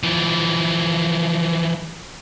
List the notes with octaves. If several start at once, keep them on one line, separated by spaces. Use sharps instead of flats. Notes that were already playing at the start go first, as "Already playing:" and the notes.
E3 F3